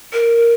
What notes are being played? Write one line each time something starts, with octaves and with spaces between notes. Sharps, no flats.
A#4